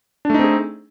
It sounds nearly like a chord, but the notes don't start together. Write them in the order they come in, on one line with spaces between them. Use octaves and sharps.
D4 A3 D#4 C4 G#4